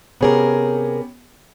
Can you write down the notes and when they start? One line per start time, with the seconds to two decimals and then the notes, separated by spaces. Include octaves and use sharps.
0.21 C3 B3 C#4 G4 G#4 A#4